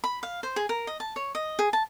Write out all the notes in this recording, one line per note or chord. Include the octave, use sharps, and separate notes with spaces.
B5
F5
C5
G#4
A#4
D#5
A5
C#5
D#5
G#4
A5